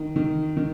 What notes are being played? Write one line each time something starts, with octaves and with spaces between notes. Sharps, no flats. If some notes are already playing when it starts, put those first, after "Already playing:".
Already playing: D#3
D#3
D#3